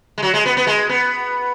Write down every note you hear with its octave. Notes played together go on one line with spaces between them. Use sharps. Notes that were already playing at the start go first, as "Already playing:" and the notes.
G#3
F#3
G#3
B3
B3
G#3
B3